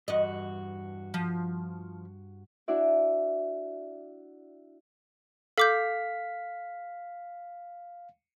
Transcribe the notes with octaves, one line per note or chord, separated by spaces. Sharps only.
E2 G2 F#4 D#5
F3
D4 E4 F#4 D5 E5
A4 F5 D6 G6 B6